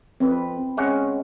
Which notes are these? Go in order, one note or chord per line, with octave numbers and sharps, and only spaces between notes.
F2 C4 B4
G#3 C#4 F#5